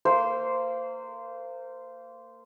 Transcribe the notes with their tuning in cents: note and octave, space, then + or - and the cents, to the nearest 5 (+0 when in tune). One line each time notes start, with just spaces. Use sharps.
A#3 -25 C5 -10